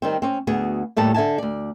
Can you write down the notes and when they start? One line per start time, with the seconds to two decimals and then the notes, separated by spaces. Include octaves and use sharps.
0.02 D#3 G3 C4
0.22 C4 C#4
0.47 D2 B3 F#4 G#4
0.97 D#2 A2 G3 A5
1.14 D3 E5 G#5 A5
1.38 D2 D5